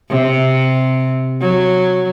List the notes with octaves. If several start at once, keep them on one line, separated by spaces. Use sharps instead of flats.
C3
F#3